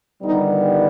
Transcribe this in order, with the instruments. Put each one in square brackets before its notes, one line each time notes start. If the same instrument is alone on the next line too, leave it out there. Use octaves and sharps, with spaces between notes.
[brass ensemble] G1 G2 D#3 G3 B3 D#4